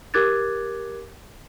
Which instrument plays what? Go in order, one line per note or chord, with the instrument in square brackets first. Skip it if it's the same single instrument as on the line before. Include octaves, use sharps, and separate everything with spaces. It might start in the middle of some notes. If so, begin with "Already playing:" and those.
[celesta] G4 A#4 D6 F#6 G#6 A6